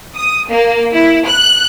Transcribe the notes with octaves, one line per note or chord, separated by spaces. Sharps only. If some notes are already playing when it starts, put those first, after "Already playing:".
D#6
A#3
E4
F#6